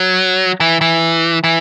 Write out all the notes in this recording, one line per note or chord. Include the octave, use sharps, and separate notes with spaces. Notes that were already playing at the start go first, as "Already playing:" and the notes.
Already playing: F#3
E3
E3
E3